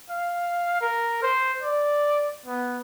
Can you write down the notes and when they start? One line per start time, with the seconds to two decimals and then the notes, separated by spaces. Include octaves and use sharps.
0.10 F5
0.82 A#4
1.23 C5
1.63 D5
2.46 B3